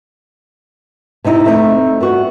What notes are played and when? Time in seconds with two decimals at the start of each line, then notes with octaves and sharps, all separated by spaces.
1.24 C3 C4 D#4 E4
1.46 A3 C4 D4 D#4
2.00 G3 B3 F#4